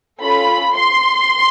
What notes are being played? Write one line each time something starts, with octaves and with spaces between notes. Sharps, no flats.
C#4 F4 A4 B5
C6